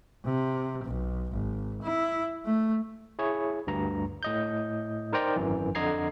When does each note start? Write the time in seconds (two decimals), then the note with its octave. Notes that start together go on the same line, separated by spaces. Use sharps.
0.25 C3
0.85 B1
1.32 G#1
1.82 E4
2.45 A3
3.19 E4 G#4 C#5
3.67 D2 G2 A#5
4.23 A2 D#5 G6
5.13 D#4 A#4 C5 D5 G5 A#5
5.36 G#1 F#2 E3
5.75 F2 D3 D#5 A#5 G#6 C7